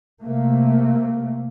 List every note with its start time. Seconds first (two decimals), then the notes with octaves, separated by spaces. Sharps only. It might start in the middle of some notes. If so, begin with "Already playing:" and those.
0.22 C3 A3 A#3